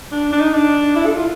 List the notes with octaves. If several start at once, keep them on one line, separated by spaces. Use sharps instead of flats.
D4
D4
D#4
D4
E4
A4
E4
F4